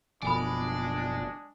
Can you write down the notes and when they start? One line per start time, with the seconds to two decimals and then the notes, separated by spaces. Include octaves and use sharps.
0.22 F#1 B2 F3 G#3 D4 D5 G#5 B5